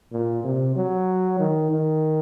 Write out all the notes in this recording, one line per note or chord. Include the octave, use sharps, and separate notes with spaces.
A#2
C3
F#3
D#3
D#3